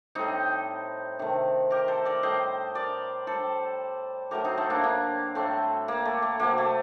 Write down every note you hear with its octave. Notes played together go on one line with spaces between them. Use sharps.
A2 G3 C4 D#4
C3 D#3 A3
G4 A#4
A4 C5
A#4 D5
A2 G3 C5 D#5
A#4 D5
A2 G3 A4 C5
A2 F#3 A3 G4 A#4
C4 D#4
A3 C4
A#3 D4
A#3
A2 G3 A3 C4
A#3
A3
A#3
C3 F#3 A3 A#3
A3